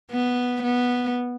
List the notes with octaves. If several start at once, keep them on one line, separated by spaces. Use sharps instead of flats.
B3
B3